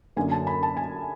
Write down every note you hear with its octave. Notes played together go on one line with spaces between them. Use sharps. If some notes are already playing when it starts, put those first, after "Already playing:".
F#2 D3 F#3 A#3 G#5
A5
B5
A5
G#5